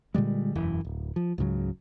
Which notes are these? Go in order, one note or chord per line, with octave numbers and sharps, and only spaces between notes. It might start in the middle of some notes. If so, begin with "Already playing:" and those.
A#2 D3 G3 G#3
E1 F#2 E3
D1
F3
C#2 G#2 C#3 F#3